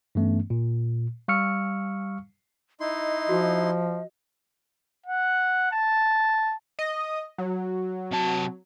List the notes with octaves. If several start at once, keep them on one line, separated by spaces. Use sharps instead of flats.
G2 E3 A3 B3 C#4
A#2
G3 F5 C#6 E6 F6 C#7
D#4 E4 D#5 C6
F3 F#4
F#5
A5
D#5
F#3
C3 A5